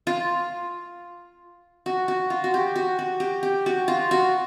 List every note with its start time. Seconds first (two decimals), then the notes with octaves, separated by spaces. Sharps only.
0.07 F4
1.86 F#4
2.08 F#4
2.30 F4
2.44 F#4
2.54 G4
2.76 F#4
2.99 F#4
3.20 G4
3.43 G4
3.66 F#4
3.88 F4
4.11 F#4